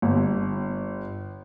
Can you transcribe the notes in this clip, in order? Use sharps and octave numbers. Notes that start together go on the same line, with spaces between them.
G1